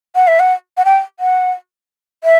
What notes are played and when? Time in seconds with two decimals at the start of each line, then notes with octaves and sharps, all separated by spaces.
0.15 F#5
0.27 E5
0.40 F#5
0.77 F#5
0.85 G5
1.20 F#5
2.24 E5